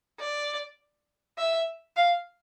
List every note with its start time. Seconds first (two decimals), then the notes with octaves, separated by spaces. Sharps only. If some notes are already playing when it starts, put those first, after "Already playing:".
0.20 D5
1.38 E5
1.97 F5